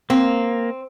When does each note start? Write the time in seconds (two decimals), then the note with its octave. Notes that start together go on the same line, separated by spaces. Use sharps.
0.10 A#3 C4